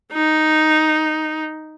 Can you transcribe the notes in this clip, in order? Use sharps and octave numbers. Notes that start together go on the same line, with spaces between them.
D#4